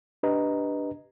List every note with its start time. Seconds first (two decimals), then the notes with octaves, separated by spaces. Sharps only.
0.23 D4 G4 B4 D#5 A#5